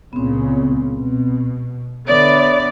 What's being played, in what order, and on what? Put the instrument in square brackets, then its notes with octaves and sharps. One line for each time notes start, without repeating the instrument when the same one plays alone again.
[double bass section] C#2 A#2 C#3 [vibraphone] B3 C4
[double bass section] B2
[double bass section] D3 [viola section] B3 D5 [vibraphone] C#5 E5 B5